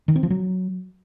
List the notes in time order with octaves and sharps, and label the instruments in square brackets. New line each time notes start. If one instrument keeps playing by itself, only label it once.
[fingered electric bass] D#3
C4
F3
F#3